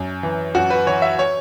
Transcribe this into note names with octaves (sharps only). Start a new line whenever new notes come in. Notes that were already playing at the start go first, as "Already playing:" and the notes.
Already playing: F#2
E3
F#2 F#4
B4
E3 C#5
E5
C#5